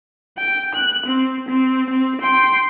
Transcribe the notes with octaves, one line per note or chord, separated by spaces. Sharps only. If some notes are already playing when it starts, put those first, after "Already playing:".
G5
F#6
C4
C4
C4
G5 C6